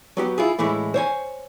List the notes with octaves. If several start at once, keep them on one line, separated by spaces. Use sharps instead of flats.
F#3 B3 G4
E4 F4 G#4
A2 E3 G#3 A3 E4
C5 C#5 G#5